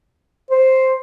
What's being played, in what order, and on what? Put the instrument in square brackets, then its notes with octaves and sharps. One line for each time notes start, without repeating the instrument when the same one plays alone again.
[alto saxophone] C5